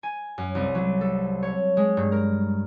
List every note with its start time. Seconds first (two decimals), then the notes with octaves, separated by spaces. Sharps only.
0.03 G#5
0.38 F#2
0.55 C2
0.75 F#3
1.01 A4
1.43 C#5
1.77 G#3
1.97 G2
2.12 A#4